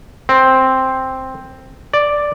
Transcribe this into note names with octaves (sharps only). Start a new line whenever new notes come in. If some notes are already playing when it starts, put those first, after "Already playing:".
C4
D5